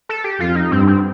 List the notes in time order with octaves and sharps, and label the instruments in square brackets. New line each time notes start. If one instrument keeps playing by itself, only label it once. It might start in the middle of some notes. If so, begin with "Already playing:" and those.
[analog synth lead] A4
G4
[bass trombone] F2 [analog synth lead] F4
[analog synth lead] D#4
[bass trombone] G2 [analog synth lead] C4
[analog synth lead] C4